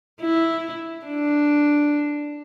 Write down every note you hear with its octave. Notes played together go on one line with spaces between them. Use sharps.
E4
D4